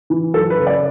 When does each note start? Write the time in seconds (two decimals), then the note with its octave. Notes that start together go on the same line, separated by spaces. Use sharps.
0.10 E3
0.34 F#2 A4
0.50 B4
0.58 C#3
0.67 D5